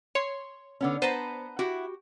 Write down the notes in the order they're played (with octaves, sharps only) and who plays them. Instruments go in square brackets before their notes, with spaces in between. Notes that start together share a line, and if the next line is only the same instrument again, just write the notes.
[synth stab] C#5 [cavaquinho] C6
[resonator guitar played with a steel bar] D3 B3 C#4
[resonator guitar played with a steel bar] B3 [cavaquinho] B4 A5 A#5 [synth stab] C5
[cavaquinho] E4 F#5 [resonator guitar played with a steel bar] F#4 G4